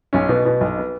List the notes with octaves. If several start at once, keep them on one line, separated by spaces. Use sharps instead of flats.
B1 C#4
B2 B3
B2 B3
B1
B3